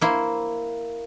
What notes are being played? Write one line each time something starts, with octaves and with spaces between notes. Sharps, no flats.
A#3 E4 C5